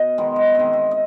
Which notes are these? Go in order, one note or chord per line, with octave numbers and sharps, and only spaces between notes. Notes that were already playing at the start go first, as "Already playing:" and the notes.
Already playing: B2 D#5
D#3 G#3 B3
D#5
D#3 G#3 C4 D#5
E5
D#5